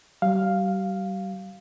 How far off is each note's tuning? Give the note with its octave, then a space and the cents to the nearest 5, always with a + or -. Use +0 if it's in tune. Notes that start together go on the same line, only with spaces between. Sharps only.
G3 -35 F5 +0